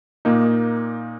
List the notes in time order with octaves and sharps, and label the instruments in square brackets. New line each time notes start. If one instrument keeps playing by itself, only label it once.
[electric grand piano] A#2 A#3 D#4